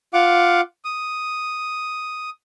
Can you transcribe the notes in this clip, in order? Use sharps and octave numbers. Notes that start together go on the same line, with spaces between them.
F4 F5 F#5 D6
D#6